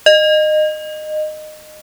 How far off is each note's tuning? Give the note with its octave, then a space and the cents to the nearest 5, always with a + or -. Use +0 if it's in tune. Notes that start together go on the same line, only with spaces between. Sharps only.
D#5 -20